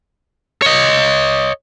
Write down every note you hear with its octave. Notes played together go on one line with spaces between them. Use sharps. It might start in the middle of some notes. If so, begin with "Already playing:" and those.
C#5 D#5